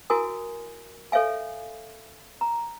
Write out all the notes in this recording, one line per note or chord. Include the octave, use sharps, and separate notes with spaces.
E4 F#4 A#4 G#5 D#6
A4 C#5 E5 F5 G#5
A#5